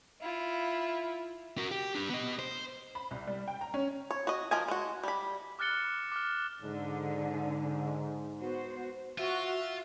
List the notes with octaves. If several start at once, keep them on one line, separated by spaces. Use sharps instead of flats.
E4 F4
F#4 A#4
G4
D4 G4
B3 D#5
C5
B5
C2
G3
G5
A#5
C#4
C#5
F#4 D#5
F3 A#4 D#5 G#5
G#3 F#4
G3 B5
D6 F6 F#6 A6 C#7 G7
D6 F6
G#2 D3
B3 F#4 C5
F4 F#4 E5